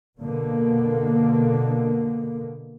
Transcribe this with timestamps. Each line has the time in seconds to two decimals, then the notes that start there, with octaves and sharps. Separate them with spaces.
0.19 B2 D3 A#3